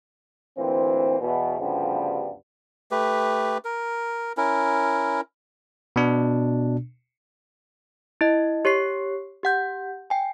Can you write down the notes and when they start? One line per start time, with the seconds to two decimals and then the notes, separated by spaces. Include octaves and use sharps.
0.57 D2 A#2 E3 C4
1.20 E2 B2
1.59 D2 G2 C#3 F3 G3 B3
2.91 A3 G4 B4
3.65 A#4
4.37 C#4 E4 A#4
5.96 B2 D4
8.21 E4 D#5
8.65 G4 C#5 C#6 C7
9.43 G4 F#5 G6
10.10 G5 G#5